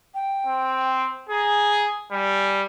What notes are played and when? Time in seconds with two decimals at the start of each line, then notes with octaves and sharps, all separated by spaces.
0.14 G5
0.47 C4
1.29 G#4 A#5
2.12 G3 G#5